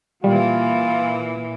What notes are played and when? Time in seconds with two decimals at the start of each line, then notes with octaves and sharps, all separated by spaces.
0.24 A#2 E3 G3 F4